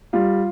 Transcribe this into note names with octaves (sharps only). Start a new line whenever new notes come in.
G3 F4